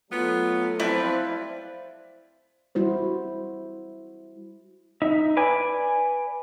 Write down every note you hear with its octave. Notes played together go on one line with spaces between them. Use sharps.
F#3 A3 B3 F4
F3 G3 C4 E4 B4 D5
G3 E4 F#4 C5
D#4 E5
B4 D5 G#5